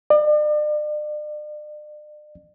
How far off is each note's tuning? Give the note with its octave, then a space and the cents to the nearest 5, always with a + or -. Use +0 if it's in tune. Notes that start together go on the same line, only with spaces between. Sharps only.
D5 +40